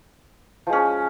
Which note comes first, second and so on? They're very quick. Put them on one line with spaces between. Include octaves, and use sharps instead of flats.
F3 G#3 C#4